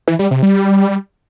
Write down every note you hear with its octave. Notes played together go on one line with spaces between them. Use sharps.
E3
G3
C3
G3